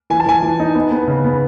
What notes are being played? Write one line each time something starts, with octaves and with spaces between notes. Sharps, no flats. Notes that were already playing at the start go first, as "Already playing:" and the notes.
E3 G#5
A5
E3 G#5
E3
D#4
B3
B3
C#3
B3